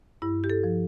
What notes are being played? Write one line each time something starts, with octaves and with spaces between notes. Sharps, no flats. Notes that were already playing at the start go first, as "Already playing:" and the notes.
G2 E4
G4
A4
F3